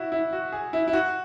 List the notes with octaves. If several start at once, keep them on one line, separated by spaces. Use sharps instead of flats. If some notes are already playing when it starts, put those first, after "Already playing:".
Already playing: E4 F#4
E4
F#4
G#4
E4
E4
F#4